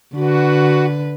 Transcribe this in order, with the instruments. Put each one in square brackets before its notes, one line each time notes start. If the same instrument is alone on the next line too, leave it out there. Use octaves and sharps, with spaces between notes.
[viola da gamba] D3 B4 [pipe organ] F#4